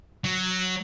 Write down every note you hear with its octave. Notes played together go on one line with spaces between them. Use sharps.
F#3